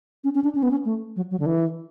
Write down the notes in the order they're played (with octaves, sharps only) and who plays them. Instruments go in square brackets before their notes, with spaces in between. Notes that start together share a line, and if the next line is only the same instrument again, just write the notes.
[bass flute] C#4
C#4
D4
C#4
B3
C#4
A3
F#3
F#3
D3
E3